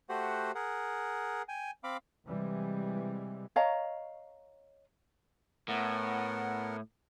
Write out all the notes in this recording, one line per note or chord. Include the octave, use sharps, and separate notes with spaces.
A3 F#4 G4 C5 F#5
G#4 A#4 F#5
G5 G#5
C4 F5 B5 D6
C3 E3 G3 G#3
C#5 D#5 F5 A#5
A2 B3 A#4 F#5